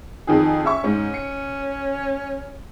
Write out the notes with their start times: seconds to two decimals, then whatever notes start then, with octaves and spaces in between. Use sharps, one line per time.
0.27 F2 D#3 G#4
0.64 C#4 E5 C#6
0.84 G#2 C#4
1.14 C#7